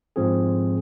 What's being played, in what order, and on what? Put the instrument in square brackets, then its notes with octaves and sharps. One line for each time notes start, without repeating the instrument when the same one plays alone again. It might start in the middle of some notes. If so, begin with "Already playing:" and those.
[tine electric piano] G#2 F3 C4 G#4